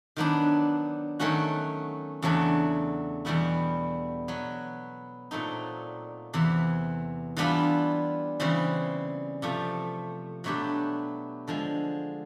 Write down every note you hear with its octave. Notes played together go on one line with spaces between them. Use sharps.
D#3 F#3 B3 D4
D#3 F#3 A3 C#4 F#4
E2 C#3 F#3 A3 D4
E2 B2 G3 B3 E4
B2 F#3 B3
A#2 F#3 A3 C4 D#4
E2 C3 E3
E3 G3 B3 D4 F4
C#3 E3 G3 C4
C3 F3 A3
B2 F#3 A3 D4 G4
D3 F3 G#3